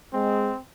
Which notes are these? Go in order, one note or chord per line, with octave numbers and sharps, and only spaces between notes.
G#3 C4